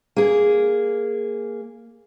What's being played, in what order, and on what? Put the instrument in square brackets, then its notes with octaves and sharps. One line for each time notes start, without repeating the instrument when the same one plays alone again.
[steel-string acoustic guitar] A#3 G#4